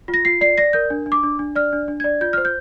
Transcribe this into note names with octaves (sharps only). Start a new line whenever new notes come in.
F4
A#6
F4 C7
D5 C7
D5 A#6
A#4 G6
D4
D4
D6
D4
D4
D5 F6
D4
D4
D5 G#6
F4 G6
C5 F6
G6